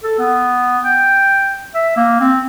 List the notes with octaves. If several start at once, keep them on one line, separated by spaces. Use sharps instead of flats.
A4
B3
G5
E5
A#3
C4